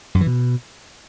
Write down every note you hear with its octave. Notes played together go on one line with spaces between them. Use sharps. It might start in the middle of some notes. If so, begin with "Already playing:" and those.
F#2
E3
B2